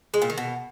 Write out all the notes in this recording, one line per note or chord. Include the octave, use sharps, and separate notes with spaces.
G#3
A#2
D#3
B2